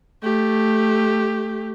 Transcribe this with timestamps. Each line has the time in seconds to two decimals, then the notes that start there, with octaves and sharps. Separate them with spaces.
0.23 A3 G4